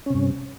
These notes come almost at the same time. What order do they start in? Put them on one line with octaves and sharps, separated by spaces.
C#4 C3 G2